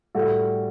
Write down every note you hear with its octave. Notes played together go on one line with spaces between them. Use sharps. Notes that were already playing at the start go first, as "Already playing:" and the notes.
A2 G3 F#4 A4